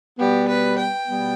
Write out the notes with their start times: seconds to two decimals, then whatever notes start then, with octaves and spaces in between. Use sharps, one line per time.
0.19 B2 G3 B3 G4
0.48 B4
0.78 G5
1.08 B2 G3 B3